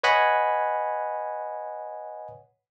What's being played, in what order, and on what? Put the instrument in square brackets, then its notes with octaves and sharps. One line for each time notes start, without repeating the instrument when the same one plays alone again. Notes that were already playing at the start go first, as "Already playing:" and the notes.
[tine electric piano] B4 C#5 D#5 F#5 G#5 B5